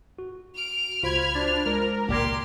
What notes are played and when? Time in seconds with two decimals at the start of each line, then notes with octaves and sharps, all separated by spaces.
0.19 F#4
0.56 F6 D7
1.03 C#2 F4 F#4 C5 B5 G#6
1.35 D4 A6
1.66 G#3 A#4
2.08 G#1 C#2 A#2 G4 D5 C6 G#6